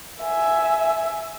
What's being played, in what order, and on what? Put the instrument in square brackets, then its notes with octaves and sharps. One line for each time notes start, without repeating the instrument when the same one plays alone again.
[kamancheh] E5 G#5